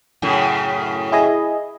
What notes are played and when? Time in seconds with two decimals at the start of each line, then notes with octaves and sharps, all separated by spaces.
0.22 F#2 A2 C#3
1.12 E4 G#4 D#5